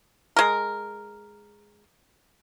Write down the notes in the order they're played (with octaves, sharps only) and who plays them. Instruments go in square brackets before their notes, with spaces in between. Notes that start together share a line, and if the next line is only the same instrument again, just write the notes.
[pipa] G#3 A#4